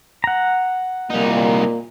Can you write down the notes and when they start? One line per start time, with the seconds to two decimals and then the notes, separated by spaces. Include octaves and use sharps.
0.24 F#5 A#5
1.10 C2 A#2 A#3 D#4